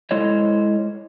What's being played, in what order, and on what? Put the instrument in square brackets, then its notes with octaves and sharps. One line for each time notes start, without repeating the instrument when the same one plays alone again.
[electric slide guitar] G#3 E4 A4 C5 C#5 D#5